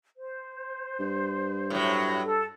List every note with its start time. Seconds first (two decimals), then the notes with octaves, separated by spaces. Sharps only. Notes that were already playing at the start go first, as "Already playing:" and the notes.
0.16 C5
0.99 G2
1.70 A2 F#3
2.25 A4